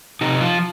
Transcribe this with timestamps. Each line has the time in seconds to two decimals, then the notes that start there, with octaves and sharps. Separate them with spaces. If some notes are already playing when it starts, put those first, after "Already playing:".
0.21 C3 D#4
0.41 F3 F4